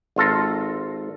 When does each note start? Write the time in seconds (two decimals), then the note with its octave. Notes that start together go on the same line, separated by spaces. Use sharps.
0.16 G#1 F4 A4 A#5